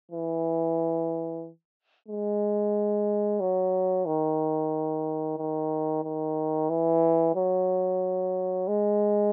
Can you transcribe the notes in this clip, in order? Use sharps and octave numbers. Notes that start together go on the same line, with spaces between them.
E3
G#3
F#3
D#3
D#3
D#3
E3
F#3
G#3